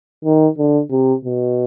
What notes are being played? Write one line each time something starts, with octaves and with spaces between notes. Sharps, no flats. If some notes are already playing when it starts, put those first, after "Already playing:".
D#3
D3
C3
B2